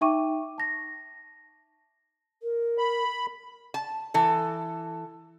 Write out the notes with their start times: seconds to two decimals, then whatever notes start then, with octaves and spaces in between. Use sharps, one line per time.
0.01 D#4 E5 G5 C#6 D6 D#7
0.58 A5 A#6
2.42 A#4
2.78 B5
3.74 A5
4.14 E3 A4